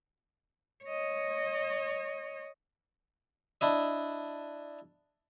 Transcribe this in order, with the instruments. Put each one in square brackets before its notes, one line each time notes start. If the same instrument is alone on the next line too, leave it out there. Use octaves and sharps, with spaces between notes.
[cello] C#5 D#5
[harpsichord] D4 E4 D#5